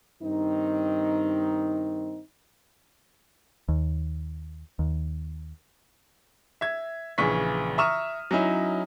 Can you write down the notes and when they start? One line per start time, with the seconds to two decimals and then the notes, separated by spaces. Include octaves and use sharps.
0.23 G2 D#3 C4 D#4
3.69 D#2
4.79 D#2
6.61 E5 G#6
7.18 A#1 C#3 E3 C#6 B6
7.78 E5 A#5 C#6 D#6 F6 E7
8.31 F#3 C#4 D#4 E4